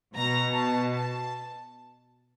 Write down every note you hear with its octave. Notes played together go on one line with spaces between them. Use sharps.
B2 A#5
A5
A5